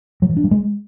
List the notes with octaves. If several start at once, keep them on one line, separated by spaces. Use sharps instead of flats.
F#3
E3
D4
G3
G#3